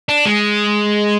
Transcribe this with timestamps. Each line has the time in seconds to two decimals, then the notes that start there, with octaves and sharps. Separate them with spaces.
0.09 D4
0.26 G#3